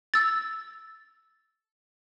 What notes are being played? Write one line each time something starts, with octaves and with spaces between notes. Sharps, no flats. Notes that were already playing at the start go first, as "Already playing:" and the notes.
E6 A6